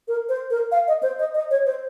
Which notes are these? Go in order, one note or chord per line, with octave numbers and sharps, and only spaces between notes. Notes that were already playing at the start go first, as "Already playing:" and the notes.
A#4
C5
A#4
F5
D#5
C5
D#5
D#5
C#5
C5